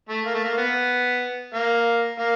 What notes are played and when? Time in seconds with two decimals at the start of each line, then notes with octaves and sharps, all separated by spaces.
0.09 A3
0.25 A#3
0.34 A3
0.44 A#3
0.57 B3
1.54 A#3
2.18 A#3